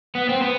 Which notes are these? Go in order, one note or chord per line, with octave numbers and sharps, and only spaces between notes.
B3
C4
B3